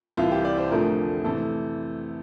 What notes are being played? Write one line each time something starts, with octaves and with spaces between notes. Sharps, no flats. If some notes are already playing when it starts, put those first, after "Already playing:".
C2 C3 E3 F4
G4
D5
C5
F1 F2 D3 F3 A3 A#4
C3 E3 A3 A4